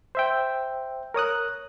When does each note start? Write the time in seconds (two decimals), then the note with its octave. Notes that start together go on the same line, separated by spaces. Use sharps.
0.15 C5 E5 G5
1.14 A#4 C#5 D#6 F#6